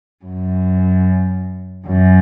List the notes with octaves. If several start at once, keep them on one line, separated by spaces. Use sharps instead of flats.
F#2
F#2